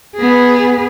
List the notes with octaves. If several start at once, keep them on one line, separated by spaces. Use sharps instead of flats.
B3 G#4